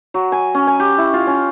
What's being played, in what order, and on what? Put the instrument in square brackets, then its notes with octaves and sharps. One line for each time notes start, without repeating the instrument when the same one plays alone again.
[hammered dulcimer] F#3
G#5
C#4
G#5
G4
E4
F4
C#4